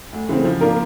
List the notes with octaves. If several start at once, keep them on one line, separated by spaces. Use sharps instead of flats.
D2
C#3 E3 A3 C4
F3
A#3 D4 F4 A#4